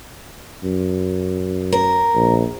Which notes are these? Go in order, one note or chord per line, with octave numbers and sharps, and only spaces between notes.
F#2
A#4
A#1